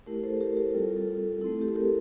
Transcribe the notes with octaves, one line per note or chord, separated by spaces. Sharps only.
A3 E4 G4 A#4
A4 C5
G4 A#4
G4 A#4
G3 C4 F4 A4
A4
A4
A3 C4 E4 A4
G4
A4
G4 A#4